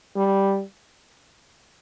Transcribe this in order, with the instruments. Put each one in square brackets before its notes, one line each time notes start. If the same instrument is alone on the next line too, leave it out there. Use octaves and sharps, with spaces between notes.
[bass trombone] G3